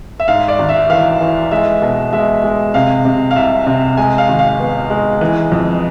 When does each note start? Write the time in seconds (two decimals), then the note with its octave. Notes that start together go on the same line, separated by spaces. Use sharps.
0.20 E5
0.28 G#2 F5
0.48 D5
0.59 G#1
0.69 E5
0.90 E3 F5
1.21 E3
1.51 G#3 E5
1.82 B2
2.13 G#3 E5
2.44 G#3
2.74 C3 F5
3.05 C3
3.31 F5
3.36 C2 E5
3.67 C3
3.97 G#3 G#5
4.18 F5
4.28 G#1
4.39 F5
4.60 B3
4.90 G#3
5.21 E3
5.52 F2